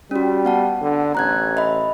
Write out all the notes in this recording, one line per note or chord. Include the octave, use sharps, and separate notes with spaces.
G3 C#4 F#4
B3 F#5 A5
D3
A1 A#5 F#6 G#6
D#5 E5 B5